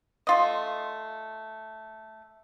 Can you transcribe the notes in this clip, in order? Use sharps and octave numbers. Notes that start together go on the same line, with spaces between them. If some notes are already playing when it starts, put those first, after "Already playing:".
A3 F4 D#5